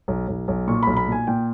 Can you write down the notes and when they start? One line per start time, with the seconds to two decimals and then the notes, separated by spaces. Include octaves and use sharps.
0.08 B1
0.28 B1
0.48 B1
0.68 A#2 C#6
0.83 B1 B5
0.97 B5
1.07 A#2 G#5
1.27 A#2 G5